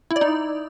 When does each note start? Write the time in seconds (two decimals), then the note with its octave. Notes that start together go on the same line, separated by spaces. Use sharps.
0.11 E4
0.16 D5
0.21 D#4